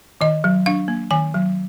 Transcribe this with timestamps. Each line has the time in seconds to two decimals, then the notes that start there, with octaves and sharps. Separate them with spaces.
0.21 D#3 D#5
0.44 F#3
0.66 D4 F5
0.88 A#3
1.11 D#3 G#5
1.34 F#3